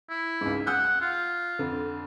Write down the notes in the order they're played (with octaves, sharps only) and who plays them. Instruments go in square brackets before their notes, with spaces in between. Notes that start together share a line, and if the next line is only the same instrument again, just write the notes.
[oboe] E4
[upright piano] C#2 G#2
[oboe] F#5 [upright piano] D#6 E6 G6
[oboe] F4
[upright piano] F2 D3